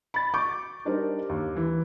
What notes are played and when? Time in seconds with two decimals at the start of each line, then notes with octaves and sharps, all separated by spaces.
0.14 B5 A6
0.34 C#6 D6 G6
0.85 G3 D4 D#4 A#4 C5
1.29 D#2
1.57 E3